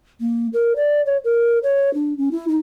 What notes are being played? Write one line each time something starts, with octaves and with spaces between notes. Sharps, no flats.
A#3
A#4
D5
C#5
A#4
C#5
D4
C#4
E4
D#4